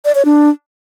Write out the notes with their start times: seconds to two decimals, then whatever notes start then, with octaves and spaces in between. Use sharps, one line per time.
0.05 D5
0.15 C#5
0.25 D4